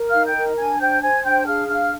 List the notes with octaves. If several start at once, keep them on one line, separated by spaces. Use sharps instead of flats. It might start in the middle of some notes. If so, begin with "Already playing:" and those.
Already playing: A#4
D#4 F5 F6
G5 G6
A#4
D4 G#5 G#6
C5 G5 G6
C5 G#5 G#6
D4 G5 G6
G#4 F5 F6
D4 F5 F6